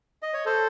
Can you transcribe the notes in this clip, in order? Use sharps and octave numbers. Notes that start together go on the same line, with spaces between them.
D#5
C#5
A4 C5